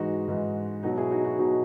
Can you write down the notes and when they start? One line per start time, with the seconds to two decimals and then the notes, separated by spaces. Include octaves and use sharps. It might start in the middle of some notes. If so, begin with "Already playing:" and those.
Already playing: G#2 E3 G#3 D#4 F#4
0.28 G#2 E3 G#3
0.83 B2 F#3 D#4 F#4
0.98 E4 G#4
1.11 D#4 F#4
1.25 D#4 F#4
1.39 B2 F#3 D#4 F#4